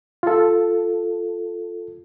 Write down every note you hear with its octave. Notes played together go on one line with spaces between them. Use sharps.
F4 A4